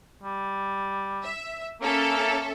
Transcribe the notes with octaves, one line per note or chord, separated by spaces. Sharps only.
G3
E5
A#3 C#4 A4 E5